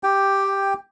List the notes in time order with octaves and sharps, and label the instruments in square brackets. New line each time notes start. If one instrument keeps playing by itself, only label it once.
[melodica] G4 G5